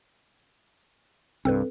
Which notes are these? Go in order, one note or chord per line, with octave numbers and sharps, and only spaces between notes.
C2 G2 C4 A4 B4